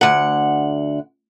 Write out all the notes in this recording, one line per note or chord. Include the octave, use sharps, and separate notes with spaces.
D2 F#5